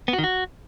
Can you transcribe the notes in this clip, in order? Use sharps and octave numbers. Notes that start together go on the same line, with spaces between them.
B3
F#4
D#3
F#4